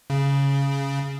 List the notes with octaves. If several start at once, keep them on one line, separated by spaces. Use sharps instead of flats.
C#3